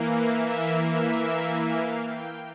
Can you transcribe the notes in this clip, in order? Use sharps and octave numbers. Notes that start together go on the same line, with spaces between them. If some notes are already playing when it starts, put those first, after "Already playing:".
Already playing: E3 A#3
E5
E5
F5
G5